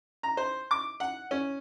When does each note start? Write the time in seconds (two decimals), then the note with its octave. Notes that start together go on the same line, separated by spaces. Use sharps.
0.23 A#5
0.37 C5
0.71 D6
1.00 F#5
1.31 C#4